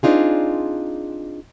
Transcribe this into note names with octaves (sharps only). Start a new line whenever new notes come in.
C4 D4 D#4 F4 G#4